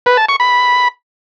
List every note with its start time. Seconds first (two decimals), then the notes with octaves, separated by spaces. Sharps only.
0.06 B4
0.17 A5
0.29 C#6
0.40 B5